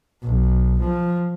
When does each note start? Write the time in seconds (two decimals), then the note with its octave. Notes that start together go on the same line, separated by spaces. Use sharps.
0.23 B1
0.80 F3